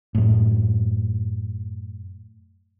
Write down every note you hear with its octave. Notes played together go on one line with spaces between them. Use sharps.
F#2 A2